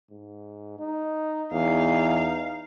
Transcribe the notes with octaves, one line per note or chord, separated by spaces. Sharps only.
G#2
D#4
E2 D#4 F5